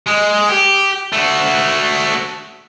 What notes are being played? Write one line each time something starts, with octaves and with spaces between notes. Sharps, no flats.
G#3
G4
A3 F#4